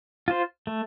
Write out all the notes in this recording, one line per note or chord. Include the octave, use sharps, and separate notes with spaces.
F4 C5
A3